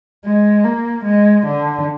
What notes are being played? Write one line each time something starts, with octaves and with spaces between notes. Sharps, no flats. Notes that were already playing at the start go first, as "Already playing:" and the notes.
G#3
A#3
G#3
D3